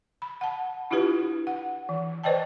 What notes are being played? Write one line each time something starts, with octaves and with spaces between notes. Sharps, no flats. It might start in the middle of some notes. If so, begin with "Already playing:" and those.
B5
F#5 A5
D4 E4 F4 G4 B4
F#5
E3
B4 C5 D5 D#5 G5 A5